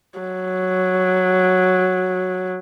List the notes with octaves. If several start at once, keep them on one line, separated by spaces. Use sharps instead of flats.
F#3